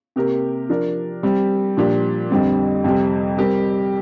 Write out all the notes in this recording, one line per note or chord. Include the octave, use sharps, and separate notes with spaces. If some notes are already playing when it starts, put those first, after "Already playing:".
C3 A#3 G4 A#4
F3 D4 A#4
G3 C4 G4
A#2 F3 D4 G4
F2 D3 G3 C4
F2 C3 G3 C4 G4
G3 C4 G4 A#4